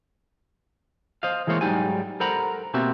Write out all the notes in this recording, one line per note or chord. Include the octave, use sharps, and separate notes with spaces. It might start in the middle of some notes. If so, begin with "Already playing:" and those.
C5 D#5 F5
E3 G#3 A#3 C5 C#5
G#2 F#3 G3 D#4 G4 G#5
A4 A#4 C5 F#5 A#5 B5
B2 A#3 C4 F#4 G4 E5